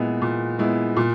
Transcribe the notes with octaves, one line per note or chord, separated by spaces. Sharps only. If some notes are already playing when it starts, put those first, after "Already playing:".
Already playing: A#2 G#3 B3 E4
A#2
G#3 B3 E4
A#2